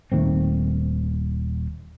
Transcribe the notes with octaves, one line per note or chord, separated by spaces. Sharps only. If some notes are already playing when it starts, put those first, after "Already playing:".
D#1 D#3 A3 C4